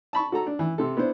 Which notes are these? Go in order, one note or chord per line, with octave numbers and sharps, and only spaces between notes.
A5 B5 C#6
F#4 A4 A#5
D4
E3
C3 A4
B3 D4 E4 C5